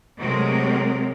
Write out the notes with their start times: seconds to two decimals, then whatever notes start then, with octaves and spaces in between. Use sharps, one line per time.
0.17 C3 F#3 G#3 A3 C4 A#4